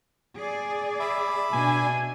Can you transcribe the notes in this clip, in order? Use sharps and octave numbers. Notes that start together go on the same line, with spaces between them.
G#4 D5
E5 B5 D6
B2 D4 G#5